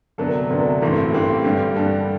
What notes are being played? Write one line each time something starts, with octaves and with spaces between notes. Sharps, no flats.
D2 C3 F#3 B3 D4 A4
D2 C3 F#3 B3 D4
A1 G2 E3 A3 C4
A1 G2 E3 A3 C4 G4
G2 D3 G3
G2 D3 G3 A4